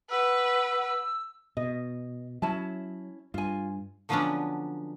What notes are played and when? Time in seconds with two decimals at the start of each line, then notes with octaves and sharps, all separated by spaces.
0.10 B4 F#5 E6
1.57 B2 D#5
2.42 F#3 C#4 E4 A5
3.34 G2 F4 G#5
4.09 D3 F3 F#3 B3 C#4 D4